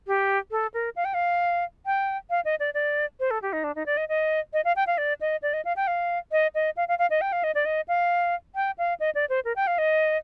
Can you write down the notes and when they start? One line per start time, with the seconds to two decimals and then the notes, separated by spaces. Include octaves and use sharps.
0.07 G4
0.51 A4
0.74 A#4
0.96 F5
1.05 G5
1.14 F5
1.86 G5
2.30 F5
2.45 D#5
2.60 D5
2.74 D5
3.20 C5
3.31 A4
3.42 G4
3.53 D#4
3.64 D4
3.75 D#4
3.86 D5
3.97 D#5
4.09 D#5
4.53 D#5
4.65 F5
4.76 G5
4.87 F5
4.98 D5
5.21 D#5
5.42 D5
5.53 D#5
5.65 F5
5.76 G5
5.87 F5
6.32 D#5
6.55 D#5
6.77 F5
6.88 F5
6.99 F5
7.10 D#5
7.21 G5
7.32 F5
7.44 D#5
7.55 D5
7.65 D#5
7.88 F5
8.55 G5
8.78 F5
9.00 D#5
9.15 D5
9.29 C5
9.45 A#4
9.56 G5
9.67 F5
9.78 D#5